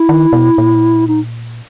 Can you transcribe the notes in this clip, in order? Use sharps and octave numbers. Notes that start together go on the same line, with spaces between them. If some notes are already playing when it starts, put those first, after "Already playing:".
Already playing: E4
D#3
B2
A#2
D#4